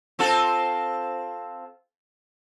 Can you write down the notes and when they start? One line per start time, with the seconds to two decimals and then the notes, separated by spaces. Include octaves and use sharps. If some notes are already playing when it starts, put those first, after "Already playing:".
0.19 C4 F4 A4